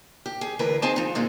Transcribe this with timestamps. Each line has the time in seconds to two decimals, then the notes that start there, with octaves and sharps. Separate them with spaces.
0.26 G4
0.41 G#4
0.59 D2 E3 A#4 B4
0.82 C4 D#4 G#4 C5 G#5 A5
0.96 F3 D#4
1.15 D2 A#2 G#3 C4 D#4